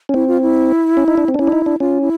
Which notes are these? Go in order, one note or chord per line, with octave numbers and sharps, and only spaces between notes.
C#4
C4 E4
F4
E4
C#4
D#4
D4
C4
D4
C#4 E4
D4
D#4
D4
C#4 F4
E4